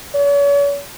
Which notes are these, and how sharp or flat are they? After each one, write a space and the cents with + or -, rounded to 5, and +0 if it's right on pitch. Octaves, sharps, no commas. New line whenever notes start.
C#5 +40